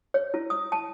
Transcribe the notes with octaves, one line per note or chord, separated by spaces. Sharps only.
C#5
E4
D#6
A5